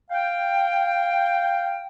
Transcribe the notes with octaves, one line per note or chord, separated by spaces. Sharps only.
F5 G5